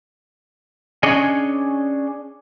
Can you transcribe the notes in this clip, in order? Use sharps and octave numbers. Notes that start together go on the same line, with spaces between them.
C#4 D4 G#4 C#5 D#5